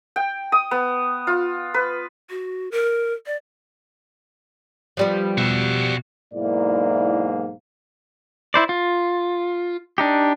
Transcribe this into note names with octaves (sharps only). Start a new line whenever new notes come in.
G5
D#6
B3
F4
B4
F#4
A#4
D5
F3 G3 B3
B2 F#4 E5
B1 G#2 A#3 E4 D5
E4 C5 D5
F4
D4 D#4 G4